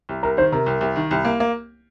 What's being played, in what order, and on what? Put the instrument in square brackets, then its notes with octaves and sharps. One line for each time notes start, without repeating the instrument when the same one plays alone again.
[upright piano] C2
[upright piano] C2 [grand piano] A#4
[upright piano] D#3 [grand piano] C5
[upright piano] C3 [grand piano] A#4
[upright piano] C2
C2
D#3
C2
A#3
A#3